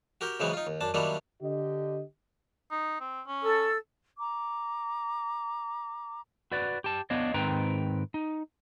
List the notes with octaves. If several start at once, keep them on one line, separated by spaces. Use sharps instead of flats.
F#4 G4 A#4 G5
C#3 E3 F#3 G#3 B3 C4
D#4 F4
D#2
F#2 D4 A5
D#3 F#3 G3 A#3 D4 E4
D3 G4 D#5
D#4
C4
C#4
A4 E6
A#5 D6
F#4 B4 D5
G4 A5
B3 D4 C#5 D#5 F5
G#2 D#3 C4 B4 G5 A#5
D#4